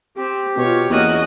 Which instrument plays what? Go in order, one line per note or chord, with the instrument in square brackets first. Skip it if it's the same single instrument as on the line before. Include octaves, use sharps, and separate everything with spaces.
[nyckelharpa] C4 [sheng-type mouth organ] G4
[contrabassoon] B2 [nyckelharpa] F4 C#5
[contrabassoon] E2 [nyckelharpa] A#3 F#4 [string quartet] C#4 D#5 F#6